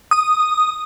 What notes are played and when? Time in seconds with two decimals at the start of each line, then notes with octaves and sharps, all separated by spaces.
0.11 D#6